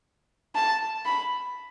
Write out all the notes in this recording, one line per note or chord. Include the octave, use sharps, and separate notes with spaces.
A5
B5